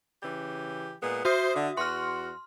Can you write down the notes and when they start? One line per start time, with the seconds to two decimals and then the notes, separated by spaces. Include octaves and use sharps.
0.23 C#3 E3 G4
1.02 A#2 G#3 B3
1.25 F#4 C5 E5 D#6
1.54 D3
1.77 E2 F#4 C6 F6